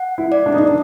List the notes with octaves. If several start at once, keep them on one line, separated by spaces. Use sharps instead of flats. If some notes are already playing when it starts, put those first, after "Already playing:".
Already playing: F#5
E4
D5
D4
D#4
D4